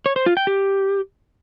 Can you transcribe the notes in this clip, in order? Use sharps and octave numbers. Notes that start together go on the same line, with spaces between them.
C#5
C5
F4
G5
G4